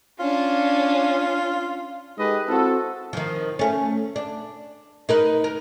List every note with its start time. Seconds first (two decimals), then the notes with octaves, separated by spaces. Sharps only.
0.19 C#4 D4 F4
2.18 G#3 D#4 G4 A4 B4 D#5
2.48 C4 E4 F#4 A4
3.13 D#3 F3
3.59 A3 C#4
4.16 D4
5.09 D#4 A#4 B4
5.44 A#4